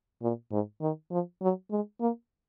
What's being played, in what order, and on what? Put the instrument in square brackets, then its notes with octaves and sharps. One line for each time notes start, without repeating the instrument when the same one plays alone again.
[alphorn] A#2
G#2
D#3
F3
F#3
G#3
A#3